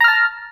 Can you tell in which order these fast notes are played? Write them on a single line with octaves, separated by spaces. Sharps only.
A#5 F6 A5